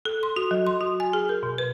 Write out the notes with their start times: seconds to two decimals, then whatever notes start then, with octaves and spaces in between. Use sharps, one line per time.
0.05 A4
0.23 C6
0.36 F#4
0.51 F#3
0.67 C6
0.81 F#4
1.00 G#5
1.13 G#4
1.29 A#4
1.43 B2
1.58 B4